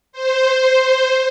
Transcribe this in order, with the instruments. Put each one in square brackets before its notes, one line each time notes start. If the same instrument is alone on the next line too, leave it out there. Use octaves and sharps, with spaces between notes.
[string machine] C5